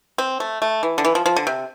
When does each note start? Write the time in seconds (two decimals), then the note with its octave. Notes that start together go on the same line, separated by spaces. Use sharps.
0.18 C4
0.40 A3
0.62 A3
0.83 E3
0.98 D3
1.05 E3
1.15 F3
1.26 F3
1.36 D3
1.47 C3